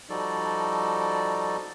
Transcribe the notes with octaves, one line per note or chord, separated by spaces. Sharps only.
F3 G3 D#4 F#4 A4 D5